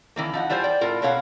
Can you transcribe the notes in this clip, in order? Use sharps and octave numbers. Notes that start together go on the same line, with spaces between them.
D#3 E3 A#3
F3 D#4 F#5
E3 G3 F4 C5 G#5
D5 G5
A2 F4 A#4
B2 A#3 C#5 F5 F#5